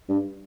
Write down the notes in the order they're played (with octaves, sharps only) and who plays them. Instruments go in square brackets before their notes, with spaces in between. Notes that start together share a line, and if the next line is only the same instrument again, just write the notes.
[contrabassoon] G2